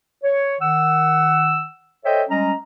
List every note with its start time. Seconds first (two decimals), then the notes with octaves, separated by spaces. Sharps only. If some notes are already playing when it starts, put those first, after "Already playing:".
0.23 C#5
0.61 D#3 F#5 E6
2.05 A4 C5 C#5 D#5 E5 G5
2.30 G3 G#3 C#4 D#5 A#5